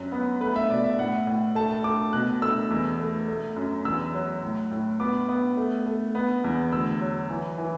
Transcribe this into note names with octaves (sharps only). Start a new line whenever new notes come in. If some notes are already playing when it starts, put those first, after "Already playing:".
Already playing: F#2 F#3
B3
A3 B4
E5
B2 D5
E5
A2 F#5
A2
A3 A5
A3 D6
B2 F#6
A3 E6
E2
A3
A3
F#2
E2 E6
F#3
A2
A2
B3 D6
B3
A3
A3
B3
E2
D2 E6
F#3
E3
E3